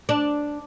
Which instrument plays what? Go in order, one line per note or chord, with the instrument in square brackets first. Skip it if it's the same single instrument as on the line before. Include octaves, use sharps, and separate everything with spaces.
[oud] D4